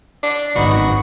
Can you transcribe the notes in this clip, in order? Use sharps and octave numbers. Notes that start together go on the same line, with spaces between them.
D4
G#1 F#2 B3 D#4 F#4 B5